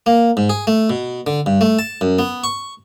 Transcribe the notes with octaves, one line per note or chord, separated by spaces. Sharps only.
A#3
G#2
G#4
A3
B2
D3
G2
A3
A5
F#2
B3
C#6